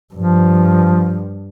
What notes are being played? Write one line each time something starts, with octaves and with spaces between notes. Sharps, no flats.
G2 F3